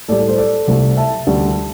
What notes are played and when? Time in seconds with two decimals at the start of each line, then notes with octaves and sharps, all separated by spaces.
0.08 A2 G3 A4 D5
0.19 A4
0.28 C5
0.38 A4 D5
0.68 C2 C3 A3
0.97 E5 A5
1.27 D2 D3 G3